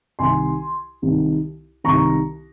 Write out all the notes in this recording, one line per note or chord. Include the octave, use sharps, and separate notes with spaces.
C2 C3 D#3 G#5 C6
C2 C3 D#3
C2 C3 D#3 A#5 C#6